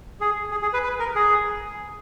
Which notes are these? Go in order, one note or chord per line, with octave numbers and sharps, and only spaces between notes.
G#4
G#4
G#4
B4
B4
A#4
G#4